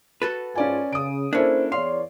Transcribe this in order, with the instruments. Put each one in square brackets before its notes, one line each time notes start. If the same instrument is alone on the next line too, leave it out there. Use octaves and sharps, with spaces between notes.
[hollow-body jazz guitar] F#4 A4 B4
[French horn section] G#2 F4 [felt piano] C#4 D5 G#5
[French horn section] C#3 [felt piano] D#6 D7
[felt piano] A#3 E4 A4 [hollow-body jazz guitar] C#4 D4 [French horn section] C5
[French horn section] E2 C#5 D5 [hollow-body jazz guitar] F5 [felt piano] C6